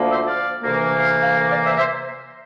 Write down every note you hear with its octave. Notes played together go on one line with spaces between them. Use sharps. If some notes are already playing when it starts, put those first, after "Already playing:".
Already playing: D2 D3 F3 A#3
C5 E5
D5 F5
D2 C3 E3 A#3
F5
F5
D5 F5
C5 E5
C5 E5